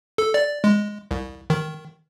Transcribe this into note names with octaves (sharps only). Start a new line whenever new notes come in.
A4
D5
G#3
C2
D#3